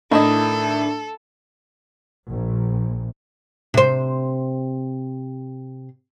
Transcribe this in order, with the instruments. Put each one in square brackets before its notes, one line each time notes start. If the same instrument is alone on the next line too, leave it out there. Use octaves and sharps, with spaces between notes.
[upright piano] A2 [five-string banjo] D#3 E4 D#5 [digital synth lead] D4 [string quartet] A4
[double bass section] A#1
[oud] C3 C5